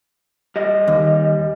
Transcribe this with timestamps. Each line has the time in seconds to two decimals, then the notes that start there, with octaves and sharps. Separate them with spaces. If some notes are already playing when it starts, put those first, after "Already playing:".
0.56 G3 D#5
0.88 D#2